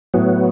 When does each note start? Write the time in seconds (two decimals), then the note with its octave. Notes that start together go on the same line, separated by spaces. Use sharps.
0.14 A2 F#3 B3